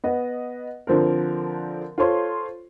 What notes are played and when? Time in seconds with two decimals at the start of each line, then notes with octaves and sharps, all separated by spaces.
0.04 B3 D#5 F#5
0.87 D3 F3 C4 A#4
1.98 F4 A4 C5 C#5 C6